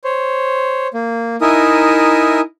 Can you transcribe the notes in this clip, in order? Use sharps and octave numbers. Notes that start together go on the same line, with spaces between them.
C5 C#5
A#3
D#4 E4 A#4 E5 G#5 D#6